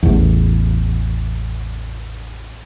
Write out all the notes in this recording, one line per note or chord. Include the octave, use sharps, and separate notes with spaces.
A1 E2